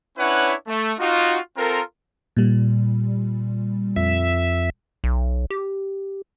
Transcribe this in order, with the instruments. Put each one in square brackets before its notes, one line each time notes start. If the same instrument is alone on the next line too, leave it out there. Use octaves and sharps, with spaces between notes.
[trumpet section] C#4 D4 E4 B4 C#5 F#5
A3
D#4 F4 F#4
C4 F4 A4 A#4
[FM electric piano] A#2 G3
[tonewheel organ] F2 E5
[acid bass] B1
G4